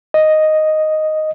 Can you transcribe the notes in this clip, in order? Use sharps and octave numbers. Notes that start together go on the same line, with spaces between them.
D#5